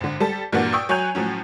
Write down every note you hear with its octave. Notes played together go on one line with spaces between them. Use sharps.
G#1 D3
G3 A4 A5
G2 A#2 E3 A#3 D4 F#4
G5 C#6 D#6 E6
F#3 C#5 G#5 F#6 G6 F7
A2 F3 F#3 C#4